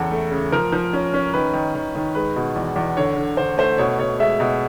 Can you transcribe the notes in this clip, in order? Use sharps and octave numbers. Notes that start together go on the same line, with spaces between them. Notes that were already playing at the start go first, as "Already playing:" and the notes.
Already playing: E2 C#3 A4
A3
C#3
F3 A#4
F3
C#4
C#4
D#3 B4
D#3
D#3
D#3
G#3 B4
B2
E2
E2
D3 C#5
D3
D3 C5
A3 C5
B2 C#5
B2 C#5
G#3 E5
B2